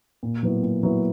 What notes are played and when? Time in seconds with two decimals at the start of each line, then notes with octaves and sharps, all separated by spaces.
0.23 A#2
0.43 F#3 B3 E4
0.63 A#2
0.83 F#3 B3 E4